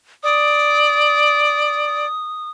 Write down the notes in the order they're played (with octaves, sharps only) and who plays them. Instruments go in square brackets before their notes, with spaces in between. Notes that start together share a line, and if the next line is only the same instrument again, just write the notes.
[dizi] D5 [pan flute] D#6